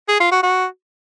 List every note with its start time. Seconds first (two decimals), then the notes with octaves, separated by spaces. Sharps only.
0.08 G#4
0.20 F4
0.32 F#4
0.43 F#4